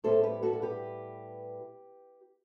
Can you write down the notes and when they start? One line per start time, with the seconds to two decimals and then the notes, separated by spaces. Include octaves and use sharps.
0.04 A2 G3 B3 A4 C5
0.23 G4 B4
0.43 F#4 A4
0.53 A4
0.62 G4 B4